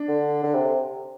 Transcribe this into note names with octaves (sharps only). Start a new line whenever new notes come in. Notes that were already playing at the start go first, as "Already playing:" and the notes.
Already playing: D4
D3
D3
C3